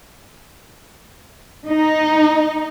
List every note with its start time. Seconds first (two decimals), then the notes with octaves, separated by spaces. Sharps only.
1.67 D#4